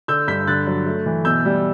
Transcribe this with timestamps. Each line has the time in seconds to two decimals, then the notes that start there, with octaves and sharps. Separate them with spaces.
0.08 D3 E6 G6
0.28 G2 G6 B6
0.47 D3 F#6 A6
0.67 F#3
0.86 A3
1.06 E3
1.25 B2 E6 G6
1.45 G3